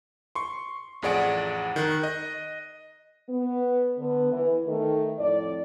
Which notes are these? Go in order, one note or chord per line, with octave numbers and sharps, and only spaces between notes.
C6 C#6
A1 F2 G#4 D5 F#5 D7
D#3 F#6
D#5
B3
D3 B3
E3
D#3 A3
F2 A2 D5